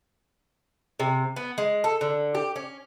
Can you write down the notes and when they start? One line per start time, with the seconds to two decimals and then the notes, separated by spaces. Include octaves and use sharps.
1.00 C3
1.36 B3
1.58 G#3
1.84 A4
2.01 D3
2.35 G4
2.56 C#4